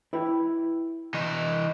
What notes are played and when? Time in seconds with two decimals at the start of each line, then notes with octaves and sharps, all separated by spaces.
0.13 E4 B4 G5
1.14 E3 D#5